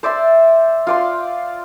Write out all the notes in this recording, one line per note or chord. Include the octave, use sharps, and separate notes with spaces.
C5 D5 E5 C6
F4 D5 C6